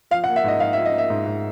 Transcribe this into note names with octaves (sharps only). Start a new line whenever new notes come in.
F3 F5
F#5
A#3
E5
G#2 D#5
G#2 F5
E5
F3
D#5
A#3 E5
G#2
G#2